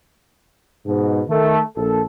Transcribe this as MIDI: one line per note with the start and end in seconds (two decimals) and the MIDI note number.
0.85 1.22 44
0.85 1.22 47
1.28 1.59 51
1.28 1.59 57
1.75 2.01 34
1.75 2.01 69